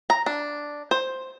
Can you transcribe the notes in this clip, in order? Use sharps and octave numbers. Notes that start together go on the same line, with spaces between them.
A#5
D4
C5